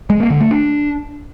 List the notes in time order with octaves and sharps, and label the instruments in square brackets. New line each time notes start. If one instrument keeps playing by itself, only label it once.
[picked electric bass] G#3
A#3
D3
A3
D4